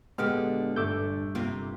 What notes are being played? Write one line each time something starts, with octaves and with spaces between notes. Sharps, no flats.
A#2 D3 G#3 B3 G4 F6
G1 G2 A3 D6 E6 G6
C3 A#3 F4